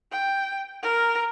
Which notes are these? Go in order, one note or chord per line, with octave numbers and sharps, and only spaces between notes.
G5
A#4